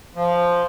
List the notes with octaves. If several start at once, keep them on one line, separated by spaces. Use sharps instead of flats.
F3